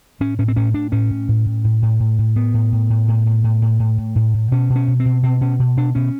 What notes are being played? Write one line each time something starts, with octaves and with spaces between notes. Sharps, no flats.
A2 C#4
A2 C#4
C4
A2 C#4
A2 D4
A2 C#4
A2
A2
A2
A2
A2
A2
A2
A2 B3
A2
A2
A2
A2
A2
A2
A2
A2
A2
A2
A2
B2 C#4
B2
C#4
B2
C4
B2
B2 C4
B2 C#4
B2
B2 D4
B2 C#4